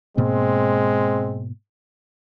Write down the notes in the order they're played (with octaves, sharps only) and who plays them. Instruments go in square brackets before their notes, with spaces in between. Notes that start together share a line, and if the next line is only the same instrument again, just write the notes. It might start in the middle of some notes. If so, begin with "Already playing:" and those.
[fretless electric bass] G#2 B2 A#3 [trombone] G#3 [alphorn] C4